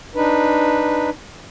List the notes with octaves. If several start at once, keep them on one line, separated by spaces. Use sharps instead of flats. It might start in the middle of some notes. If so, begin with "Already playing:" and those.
D4 D#4 B4